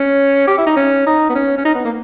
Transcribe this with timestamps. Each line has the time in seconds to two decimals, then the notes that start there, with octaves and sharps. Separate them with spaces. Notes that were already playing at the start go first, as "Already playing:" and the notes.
Already playing: C#4
0.47 G4
0.58 E4
0.67 D#4
0.76 C#4
1.06 D#4
1.29 B3
1.35 C#4
1.58 C#4
1.65 D#4
1.75 B3
1.85 A#3